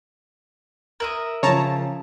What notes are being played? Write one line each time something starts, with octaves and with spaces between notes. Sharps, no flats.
A#4 E5 D#6 F#7
C#3 F3 C#5 A5 A#5